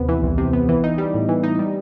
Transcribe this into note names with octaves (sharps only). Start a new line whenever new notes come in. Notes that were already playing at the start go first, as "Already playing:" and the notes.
Already playing: D#2 C3 B3
E3
C2
C3
B3
E3
D#4
G3
A2
E3
D#4
G3